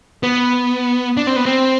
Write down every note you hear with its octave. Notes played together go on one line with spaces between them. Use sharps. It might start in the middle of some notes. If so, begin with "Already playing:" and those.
B3
D4
C4
B3
C4